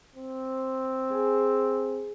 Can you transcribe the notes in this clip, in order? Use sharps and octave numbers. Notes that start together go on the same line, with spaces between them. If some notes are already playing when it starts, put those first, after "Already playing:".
C4
G#4 G#5